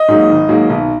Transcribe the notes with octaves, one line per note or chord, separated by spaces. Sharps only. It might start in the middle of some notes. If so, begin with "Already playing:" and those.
Already playing: D#5
G#2 F#3 A#3
G#1
G#2 F#3 A#3
B1